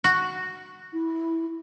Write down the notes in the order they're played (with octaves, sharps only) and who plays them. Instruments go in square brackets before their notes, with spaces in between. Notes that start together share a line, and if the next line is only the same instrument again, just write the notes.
[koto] F#4
[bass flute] E4